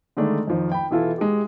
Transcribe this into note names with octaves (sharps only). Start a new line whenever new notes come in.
D3 D#3 G#3 A3 D4
F2 D#3 F3
G5 B5
B2 E3 E4 F4 A4
G#3 G4